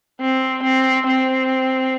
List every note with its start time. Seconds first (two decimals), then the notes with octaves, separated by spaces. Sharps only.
0.21 C4
0.63 C4
1.07 C4